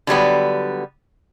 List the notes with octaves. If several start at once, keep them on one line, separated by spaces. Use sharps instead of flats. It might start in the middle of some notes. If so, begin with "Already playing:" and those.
D3 F#3 G3 B3